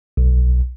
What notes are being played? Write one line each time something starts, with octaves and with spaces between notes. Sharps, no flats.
B1